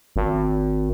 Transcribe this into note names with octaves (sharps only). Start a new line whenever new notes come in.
G#1